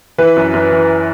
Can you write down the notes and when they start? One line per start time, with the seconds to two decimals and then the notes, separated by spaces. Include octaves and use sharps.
0.18 E3 B4
0.36 F#2
0.54 F#2
0.72 E3